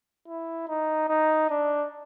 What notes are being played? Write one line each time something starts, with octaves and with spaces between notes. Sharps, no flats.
E4
D#4
D#4
D4